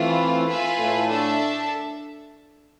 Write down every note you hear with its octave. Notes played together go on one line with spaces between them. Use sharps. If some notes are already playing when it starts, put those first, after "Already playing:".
Already playing: E3 A3 C4 F4
F4 B4 E5 G#5
A2 A3
D4 A4 E5 A5